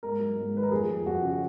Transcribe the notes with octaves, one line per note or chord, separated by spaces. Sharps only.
G#2 A#4
F#3
G#2
D#3 B4
A#4
F2 G#4
F3
F2 F#4
C#3
F#4